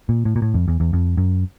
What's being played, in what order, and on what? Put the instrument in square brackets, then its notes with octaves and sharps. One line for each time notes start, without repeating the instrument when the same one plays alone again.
[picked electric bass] A#2
A2
A#2
A2
F2
E2
E2
F2
F#2